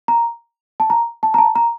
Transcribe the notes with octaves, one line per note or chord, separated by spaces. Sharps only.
A#5
A5
A#5
A5
A#5
A5
A#5